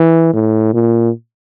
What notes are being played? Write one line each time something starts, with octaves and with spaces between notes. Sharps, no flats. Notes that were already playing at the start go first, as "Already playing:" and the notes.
Already playing: E3
A2
A#2